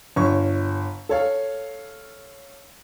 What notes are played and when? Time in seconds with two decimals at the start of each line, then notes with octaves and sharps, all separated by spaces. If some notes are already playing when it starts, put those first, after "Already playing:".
0.16 G1 C#5 C#6
1.09 A4 C#5 F5